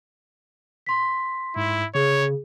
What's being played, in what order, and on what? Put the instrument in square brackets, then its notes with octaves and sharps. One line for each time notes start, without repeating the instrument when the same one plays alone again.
[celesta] C6 B6
[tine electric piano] G#2 [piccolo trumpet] E4
[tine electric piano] C#3 [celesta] G#4 [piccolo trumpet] C#5